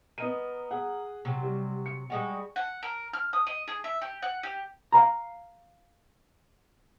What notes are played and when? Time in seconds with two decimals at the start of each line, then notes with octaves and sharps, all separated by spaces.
0.18 B3 A#4 D#5 D#7
0.71 G#4 F#5
1.25 C3 F#3
1.43 G3
1.86 C#7
2.10 G3 G#3 F#4
2.56 F#5
2.83 A#4
3.13 F6
3.33 D#6
3.47 D#5
3.68 G#4
3.84 E5
4.02 G4
4.22 F#5
4.43 G4
4.92 F5 A#5